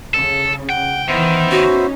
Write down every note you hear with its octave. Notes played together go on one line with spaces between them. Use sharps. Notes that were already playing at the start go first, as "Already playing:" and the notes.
C#3 A4
F#5 G5
D#3 E3 B3 C5 E5
C#4 D#4 F#4